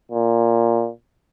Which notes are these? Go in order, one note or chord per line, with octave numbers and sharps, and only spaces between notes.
A#2